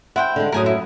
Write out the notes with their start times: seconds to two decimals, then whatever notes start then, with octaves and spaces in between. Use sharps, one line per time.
0.16 E4 C5 F#5 G5
0.36 D3 G#3
0.52 F#2 A2 F#3 A#4 G#5 D#6
0.66 E4